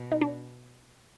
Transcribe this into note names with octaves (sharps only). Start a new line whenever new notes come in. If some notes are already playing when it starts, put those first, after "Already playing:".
Already playing: B2
D#4
D4